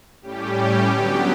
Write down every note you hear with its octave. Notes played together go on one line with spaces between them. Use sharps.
A2 G3 C#4 G4
D3 F#3 B3